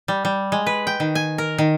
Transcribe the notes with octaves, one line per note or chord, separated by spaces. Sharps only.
G3
G3
G#3
B4
G5
D#3
G#5
A#4
D#3